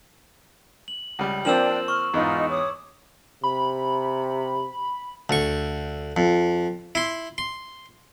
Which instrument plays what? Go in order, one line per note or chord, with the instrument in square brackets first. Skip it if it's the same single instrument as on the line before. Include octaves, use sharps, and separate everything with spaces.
[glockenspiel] F#7
[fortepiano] C#2 G3
[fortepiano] F3 A#3 C4 [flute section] D4 G5 [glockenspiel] E6 E7 F#7
[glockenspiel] C#6 [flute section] F6
[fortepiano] E2 G#2 [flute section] D#4 F4
[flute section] C#5 D6 D#6
[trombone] C3 [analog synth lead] B5
[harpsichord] D2 C#6
F2
E4 C6
C6